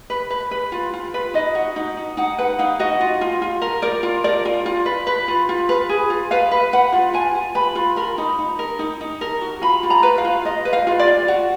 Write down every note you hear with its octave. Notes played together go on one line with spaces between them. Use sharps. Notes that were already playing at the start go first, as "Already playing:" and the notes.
B4
B4
B4
F4
F4
B4
D#4 D#5
F#4
D#4
D#4
D#4 F#5
B4 F#5
D#4 F5
F#4 D#5
F4
F4
F4
A#4
A#4 D5
F4
A#4 D5
F4
F4
B4
B4
F4
F4
B4
G#4
F4
B4 F5
B4
B4 F#5
F4
F4 G#5
F4
B4 B5
F4
A#4 B5
D#4
D#4
A#4
D#4
D#4
A#4
F#4
F4 B5
F4
A#5
B4
F5
F4
F4 D#5
B4
F5
F4
D5
F4
F#4